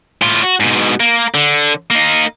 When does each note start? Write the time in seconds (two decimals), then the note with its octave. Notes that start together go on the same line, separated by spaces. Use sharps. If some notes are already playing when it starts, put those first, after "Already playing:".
0.22 A2 F4
0.44 F#4
0.60 G#2 B2
1.00 A#3
1.34 D3
1.90 A#3 D#4